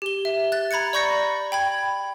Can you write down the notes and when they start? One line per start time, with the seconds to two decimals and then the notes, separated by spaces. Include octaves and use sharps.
0.02 G4 G7
0.25 E5
0.52 F#6 A6
0.71 A#5 B5 G#6 A6 C#7
0.93 D5 B5 C#6 G6 A#6 C#7
1.52 G5 B5 G#6